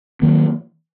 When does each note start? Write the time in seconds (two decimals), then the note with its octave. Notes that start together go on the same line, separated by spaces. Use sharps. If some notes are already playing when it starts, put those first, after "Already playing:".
0.22 D#3 F#3 A#3